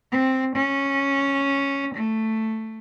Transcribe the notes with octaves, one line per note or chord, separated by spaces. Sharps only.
C4
C#4
A3